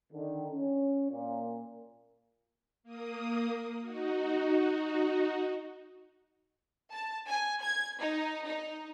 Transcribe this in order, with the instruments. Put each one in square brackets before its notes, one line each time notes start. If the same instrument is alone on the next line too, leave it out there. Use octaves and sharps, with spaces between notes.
[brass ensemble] D3 D#3
C#4
A#2
[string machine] A#3 D#6
D#4 F#4
[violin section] A5
G#5
G#6
D#4
D#4